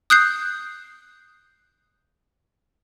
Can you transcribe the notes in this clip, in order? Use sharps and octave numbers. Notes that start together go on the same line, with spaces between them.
D#6 F#6 G6 C7